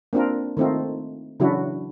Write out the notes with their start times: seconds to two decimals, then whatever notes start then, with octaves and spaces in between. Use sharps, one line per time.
0.13 A#3 C4 D4 F4 A#4
0.57 D#3 A3 C4 D#4 F4
1.40 C#3 E3 F#3 D4 E4 F#4